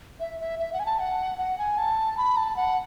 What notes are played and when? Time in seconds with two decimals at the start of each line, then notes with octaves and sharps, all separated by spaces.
0.20 E5
0.40 E5
0.59 E5
0.73 F#5
0.79 G#5
0.86 A5
0.99 F#5
1.38 F#5
1.58 G#5
1.78 A5
2.17 B5
2.37 A5
2.56 F#5